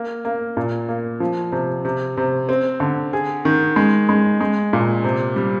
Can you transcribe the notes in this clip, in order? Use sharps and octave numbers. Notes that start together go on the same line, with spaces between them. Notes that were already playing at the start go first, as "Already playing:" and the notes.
Already playing: A#3
A#3
A#2
A#3
F3
C3
C3
C3
C4
D3
G#4
D#3
G#3
G#3
G#3
A#2
C3
G3